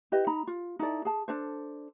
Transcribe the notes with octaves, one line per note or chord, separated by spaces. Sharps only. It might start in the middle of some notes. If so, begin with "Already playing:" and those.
E4 G4 B4 D#5
D#4 A#5 B5
F4
D#4 E4 A4 D5
G#4 A5
D4 A4 C5